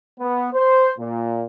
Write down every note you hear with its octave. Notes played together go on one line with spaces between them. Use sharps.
B3
C5
A#2